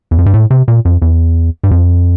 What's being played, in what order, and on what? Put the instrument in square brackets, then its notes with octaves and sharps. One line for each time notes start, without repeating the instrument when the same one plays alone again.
[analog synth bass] E2
F2
G2
A2
C3
A#2
F2
E2
G2
F2